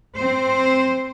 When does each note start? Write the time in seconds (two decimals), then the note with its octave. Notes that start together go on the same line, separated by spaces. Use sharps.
0.16 C4 C5